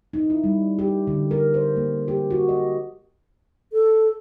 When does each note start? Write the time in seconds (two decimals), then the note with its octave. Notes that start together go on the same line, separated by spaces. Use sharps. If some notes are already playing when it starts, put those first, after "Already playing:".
0.13 D#4
0.30 E4
0.44 G3
0.79 G4
1.07 D3
1.31 A#4
1.54 C5
1.76 A#3
2.08 G4
2.31 F#4
2.49 D#5
3.72 A4